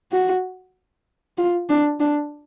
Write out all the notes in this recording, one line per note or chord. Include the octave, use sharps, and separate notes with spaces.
F#4
F4
D4
D4